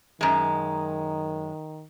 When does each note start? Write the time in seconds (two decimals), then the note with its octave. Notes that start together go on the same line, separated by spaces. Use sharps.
0.21 F#2 D#3 G#3